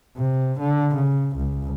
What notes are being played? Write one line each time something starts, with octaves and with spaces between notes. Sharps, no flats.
C3
D3
C#3
C#2